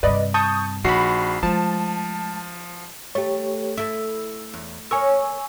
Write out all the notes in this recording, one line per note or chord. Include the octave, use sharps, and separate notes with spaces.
G2 C3 B4 D5 D#5
A5 C#6 D#6 G6
A#1 D#4 F#4 B5 C7
F3 G#3 A3 A5
A3 G4 C#5
A3 E4 E6
E2
A#4 C#5 G#5 C#6 E6